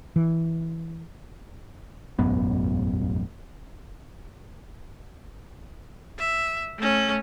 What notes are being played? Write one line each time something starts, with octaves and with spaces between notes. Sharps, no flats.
E3
E1 A1 F#2 B3
E5
A3 C#4